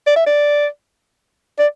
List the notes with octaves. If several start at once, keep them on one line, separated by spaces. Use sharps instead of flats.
D5
E5
D5
D5